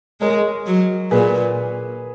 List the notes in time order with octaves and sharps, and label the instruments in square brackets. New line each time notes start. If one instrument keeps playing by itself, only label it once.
[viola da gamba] G#3 [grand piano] A#4 C#5
[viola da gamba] F#3
[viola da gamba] A#2 [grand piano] G#4 B4